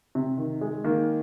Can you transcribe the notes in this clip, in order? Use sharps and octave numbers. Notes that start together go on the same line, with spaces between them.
C3
D#3
G#3
D#3 A#3